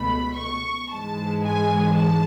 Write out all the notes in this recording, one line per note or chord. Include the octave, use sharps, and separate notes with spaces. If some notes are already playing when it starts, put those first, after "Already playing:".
Already playing: C#2 B2 A3 B5
C#6
G#2 E3 G#3 A5
G#5
A5